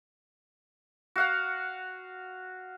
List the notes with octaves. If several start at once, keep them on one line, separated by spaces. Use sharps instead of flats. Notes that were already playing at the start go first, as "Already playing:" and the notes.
F#4 F5 F#5